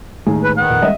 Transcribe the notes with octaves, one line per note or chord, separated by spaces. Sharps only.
D#2 A2 G#3 A3 G#4
B4
D#3 B3 F#5
F2 A#2
G3 G#3 D#5 E5